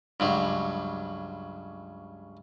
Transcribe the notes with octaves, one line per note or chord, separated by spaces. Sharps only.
C#2 G2 F#3